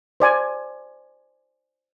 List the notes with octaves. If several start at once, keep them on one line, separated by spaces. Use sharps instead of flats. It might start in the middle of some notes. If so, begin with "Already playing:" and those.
C5 D5 G#5